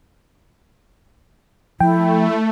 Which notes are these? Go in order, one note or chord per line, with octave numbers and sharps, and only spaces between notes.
F3 A3 E4 G5